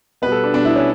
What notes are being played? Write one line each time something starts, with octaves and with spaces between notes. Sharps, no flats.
B2 G3 B3 B4
A4
D4
B2 G3 B3 D4
E4
C#4